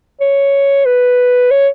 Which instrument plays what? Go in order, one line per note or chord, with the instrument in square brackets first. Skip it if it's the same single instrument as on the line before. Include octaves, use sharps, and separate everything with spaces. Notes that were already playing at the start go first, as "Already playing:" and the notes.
[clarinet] C#5
B4
C#5